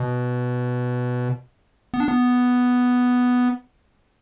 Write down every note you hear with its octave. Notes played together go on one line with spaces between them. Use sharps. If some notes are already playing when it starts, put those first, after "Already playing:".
Already playing: B2
B3
D4
B3